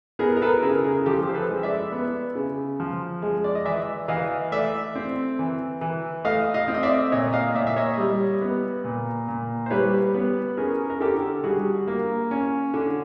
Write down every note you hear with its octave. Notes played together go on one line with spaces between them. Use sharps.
B3 G#4 A#4
A#4
A4 B4
C#3 G#4 A#4
G#4 A#4
F3 G4 A4
C5
A4 B4
G#3
D5 E5
B3
C#3
F3
G#3
D5
D#5
E3 D5 E5
E3 D#5 F5
A3 D5 E5
C4
E3
E3
A3 D#5 F5
D#5 F5
C4
D#5
D5 E5
A#2 C#5 D#5
D#5 F5
A#2 D5 E5
E5
C#5 D#5
G3
B3
A#2
A#2
C5
G3 B4 C#5
B3
C#4 G#4 A#4
A#4
D3 G4 A4
G3 F#4 G#4
A#3
C#4
D3